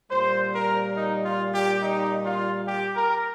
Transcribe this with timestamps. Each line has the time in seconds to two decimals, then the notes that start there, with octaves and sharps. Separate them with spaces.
0.10 A#2 G3 C5
0.54 A#4
0.96 D#4
1.25 F4
1.53 G4
1.82 D#4
2.25 F4
2.67 G4
2.96 A#4